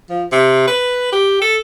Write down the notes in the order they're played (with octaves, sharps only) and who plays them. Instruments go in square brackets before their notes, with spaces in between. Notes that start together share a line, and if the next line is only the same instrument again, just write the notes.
[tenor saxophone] F3
C3
B4
G4
A4